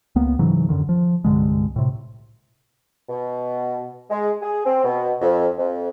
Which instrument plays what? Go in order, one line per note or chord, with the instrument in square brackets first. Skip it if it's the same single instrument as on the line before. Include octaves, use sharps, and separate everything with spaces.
[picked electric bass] C#2 A#3 B3
G#2 C#3 E3 F#3
F#2 B2 D3 D#3
F3
C2 G2 D3 G#3
A2 C3
[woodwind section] B2
G#3
G#4
C4
B2
F2
F2